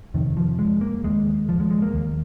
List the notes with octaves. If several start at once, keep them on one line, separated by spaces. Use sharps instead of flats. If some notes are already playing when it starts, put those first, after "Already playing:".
F2 C3 D#3
F3
G#3
A#3
D#2 G#3
F3
G#3
G#3
A#3
D#2